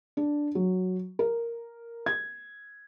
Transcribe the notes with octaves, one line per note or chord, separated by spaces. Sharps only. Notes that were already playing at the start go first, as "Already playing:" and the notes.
D4
F#3
A#4
G#6